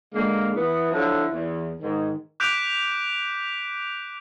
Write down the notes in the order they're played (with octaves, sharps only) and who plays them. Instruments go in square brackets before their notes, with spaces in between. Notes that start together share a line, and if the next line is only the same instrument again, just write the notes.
[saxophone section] A#2 D3 A#3 [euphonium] G#3
[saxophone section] E3 B3 [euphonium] E4
[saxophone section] D3 F3 F#3
E2
[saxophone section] G#2 [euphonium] D#3
[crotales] D6 F#6 G6 B6 D7 F7